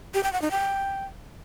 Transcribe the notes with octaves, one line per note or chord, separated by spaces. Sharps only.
G4
G5
F#5
D#4
G5